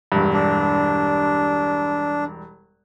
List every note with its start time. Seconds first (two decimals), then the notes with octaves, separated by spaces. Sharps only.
0.12 E1 G2
0.33 D4